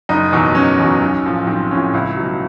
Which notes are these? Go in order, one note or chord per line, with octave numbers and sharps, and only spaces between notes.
F#1 D#4
E2 B2 F#3
F#1 C#4
E2 B2 F#3
B1
A2 F3
B1 C4
A2 F3 C#4
C#2 E4
B2 F#3